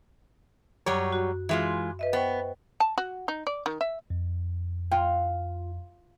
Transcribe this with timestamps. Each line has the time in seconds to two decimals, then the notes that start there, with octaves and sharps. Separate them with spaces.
0.86 F#2 F#3 G3 C#5
1.12 F#4
1.49 E3 G#3 F4
1.99 B4 D#5 E5
2.13 B3 C5 G5 C#6
2.80 A5
2.98 F#4
3.28 D#4
3.47 D5
3.66 D#3
3.81 E5
4.10 F2
4.92 F4 G5